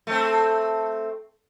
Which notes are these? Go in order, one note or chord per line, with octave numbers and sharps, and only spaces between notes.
A3 C4